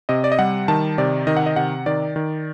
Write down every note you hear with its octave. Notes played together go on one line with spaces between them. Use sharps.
C3 D#5
D5
D#5
G3 F#5
D#3 A5
C3 D5
D#3 D#5
F#5
D#5
C3 F#5
D#3 D5
D#3